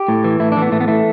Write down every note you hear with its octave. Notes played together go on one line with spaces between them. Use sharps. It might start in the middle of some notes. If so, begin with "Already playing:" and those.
Already playing: G4
A2
E3
A2 E4
D4
E3
B3
A2 A3
B3
E3 A3